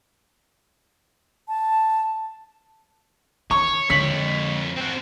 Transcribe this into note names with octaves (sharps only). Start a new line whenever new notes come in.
A5
D#3 C#5 C#6
F2 D3 G#3 C#5 B6 F#7
C4 F#4